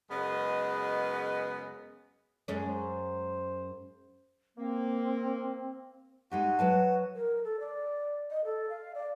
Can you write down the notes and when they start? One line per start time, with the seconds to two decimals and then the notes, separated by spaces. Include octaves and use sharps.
0.11 F#2 C#3 G#3 B3 B4 D#5
2.48 F#2 G#3 C#4
2.69 C5
4.58 A#3 C4
6.31 G#3 D#4 F#4 G4
6.59 F#3 B4 A5
7.15 A#4
7.44 A4
7.60 D5
8.31 D#5
8.45 A4
8.70 F5
8.95 D5